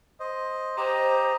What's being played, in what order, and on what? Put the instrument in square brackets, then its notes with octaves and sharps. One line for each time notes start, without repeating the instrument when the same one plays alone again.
[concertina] C5 D#5
[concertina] G4 D#5 A#5 [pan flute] C5